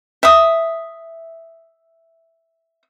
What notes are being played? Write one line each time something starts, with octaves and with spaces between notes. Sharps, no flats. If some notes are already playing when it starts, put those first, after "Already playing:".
E5 D#6